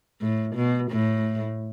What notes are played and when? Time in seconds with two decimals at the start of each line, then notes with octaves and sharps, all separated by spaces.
0.21 A2
0.56 B2
0.91 A2